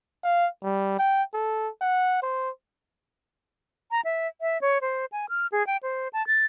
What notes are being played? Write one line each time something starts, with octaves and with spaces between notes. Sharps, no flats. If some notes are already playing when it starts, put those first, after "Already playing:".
F5
G3
G5
A4
F#5
C5
A#5
E5
E5
C#5
C5
G#5
F6
G#4
G5
C5
A5
A6